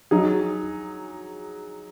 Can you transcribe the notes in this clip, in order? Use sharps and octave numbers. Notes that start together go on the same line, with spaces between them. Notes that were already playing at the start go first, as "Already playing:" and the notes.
F#3 D#4 G#4